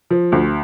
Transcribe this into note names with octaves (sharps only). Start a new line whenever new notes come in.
F3
D2